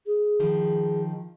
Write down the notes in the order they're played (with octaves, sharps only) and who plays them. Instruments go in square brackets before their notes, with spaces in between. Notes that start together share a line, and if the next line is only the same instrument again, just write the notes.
[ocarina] G#4
[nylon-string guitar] D#3 F3